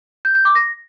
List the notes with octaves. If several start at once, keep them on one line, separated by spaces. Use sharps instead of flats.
G6
G6
D6
A#6